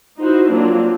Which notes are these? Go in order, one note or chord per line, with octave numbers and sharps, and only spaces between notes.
D#4 E4 F#4 C5
F#3 A#3 C4 D4 F4